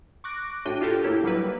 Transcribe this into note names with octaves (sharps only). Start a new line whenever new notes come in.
C#6 D6 F#6 A#6 D7
A2 D4 F#4 G5 D#7
D4 F4 G4 A4 A#4
A2 A#3 E4 G4
F#3 G3 A#3 E4 B4